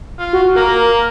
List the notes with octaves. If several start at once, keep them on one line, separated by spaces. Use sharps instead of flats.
F4
F#4
A#3 A#4